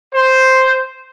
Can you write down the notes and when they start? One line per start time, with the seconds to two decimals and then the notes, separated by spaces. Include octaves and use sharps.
0.14 C5